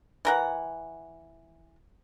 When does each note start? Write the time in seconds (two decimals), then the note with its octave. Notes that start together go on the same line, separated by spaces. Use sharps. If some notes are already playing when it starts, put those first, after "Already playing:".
0.25 E3 A#4 F#5